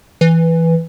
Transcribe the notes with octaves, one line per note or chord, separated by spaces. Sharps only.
E3